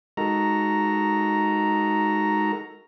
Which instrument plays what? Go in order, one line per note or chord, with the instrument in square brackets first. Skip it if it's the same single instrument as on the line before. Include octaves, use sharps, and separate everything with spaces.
[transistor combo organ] G#3 D#4 F#4 A4 A#4 A#5